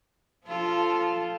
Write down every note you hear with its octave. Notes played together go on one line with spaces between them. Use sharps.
F3 F4 A4